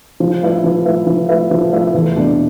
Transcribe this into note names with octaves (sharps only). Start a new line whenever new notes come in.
F3
A3 E4 B4 E5
F3
A3 E4 B4 E5
F3
A3 E4 B4 E5
F3
A3 E4 B4 E5
E2
B2 A3 D4